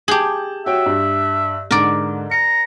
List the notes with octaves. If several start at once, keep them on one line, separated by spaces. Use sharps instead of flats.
G4 G#4 A5 G6 F#7
F#4 C#5 E5 G5
G2
G#2 D3 A#4 D5
A#5 C#7